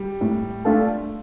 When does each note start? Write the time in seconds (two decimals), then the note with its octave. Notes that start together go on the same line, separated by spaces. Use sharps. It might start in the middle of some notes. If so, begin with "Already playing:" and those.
Already playing: G3
0.21 A2
0.65 A3 D4 F4 A4